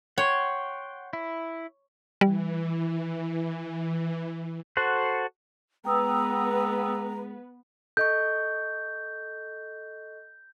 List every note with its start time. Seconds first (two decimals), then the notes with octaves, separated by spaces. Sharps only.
0.18 C#5 F#5 G5 C6
1.13 E4
2.21 E3 G3
4.77 F#4 A4 C5 F#5
5.85 G#3 B3 B4 G5 A#5 D#6 E6
7.97 A4 D#5 C#6 G6